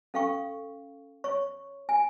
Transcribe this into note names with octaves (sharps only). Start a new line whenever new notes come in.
C#4 A4 F5 G5 C#6
C#5 C#6
G#5